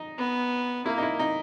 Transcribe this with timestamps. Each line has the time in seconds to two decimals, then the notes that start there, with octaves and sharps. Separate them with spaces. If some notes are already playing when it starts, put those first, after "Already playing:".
Already playing: D#4
0.18 B3
0.86 A#3 E4
0.98 D#4
1.03 E4
1.19 D#4